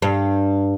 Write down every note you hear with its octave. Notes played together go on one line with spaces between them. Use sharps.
G2